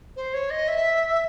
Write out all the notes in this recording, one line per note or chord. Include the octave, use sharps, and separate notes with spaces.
C5
C#5
D#5
E5